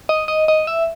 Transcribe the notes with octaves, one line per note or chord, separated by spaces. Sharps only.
D#5
D#5
D#5
E5